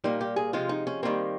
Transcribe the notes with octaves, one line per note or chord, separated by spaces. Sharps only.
A#2 G3 A#3 D#4
G4
G#4
C3 F3 G#3 F4
D#4
C#4
D#3 G3 A#3 C4